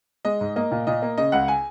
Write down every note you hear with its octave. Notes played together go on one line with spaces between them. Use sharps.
G#3 D#5
G#2
A#3 D#5
A#2
A#2 D#5
A#3
C#3 D#5
C#2 F#5
G#5